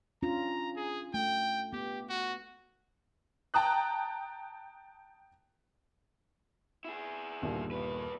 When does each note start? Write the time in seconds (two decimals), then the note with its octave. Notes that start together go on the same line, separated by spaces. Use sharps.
0.23 C#4 D4 F4 A#5
0.76 G#4
1.14 A3 G5
1.73 B3 G4
2.09 F#4
3.54 G5 A5 A#5 D#6 F#6
6.85 E4 G#4
7.42 G1 D#2 A#2
7.71 E2 B4